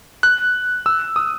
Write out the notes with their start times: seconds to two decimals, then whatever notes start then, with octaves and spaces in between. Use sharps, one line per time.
0.23 F#6
0.86 E6
1.16 D#6